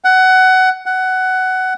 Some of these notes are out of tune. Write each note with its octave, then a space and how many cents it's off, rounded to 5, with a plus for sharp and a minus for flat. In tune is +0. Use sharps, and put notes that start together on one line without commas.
F#5 +20
F#5 +15